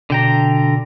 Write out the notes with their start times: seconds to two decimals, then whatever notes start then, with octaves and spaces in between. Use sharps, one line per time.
0.10 B2 D3 G5 A#5